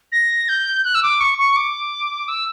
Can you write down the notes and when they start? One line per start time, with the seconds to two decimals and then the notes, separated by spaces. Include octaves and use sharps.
0.12 A#6
0.49 G6
0.84 F#6
0.95 E6
1.03 D6
1.20 C#6
1.38 C#6
1.56 D6
2.28 E6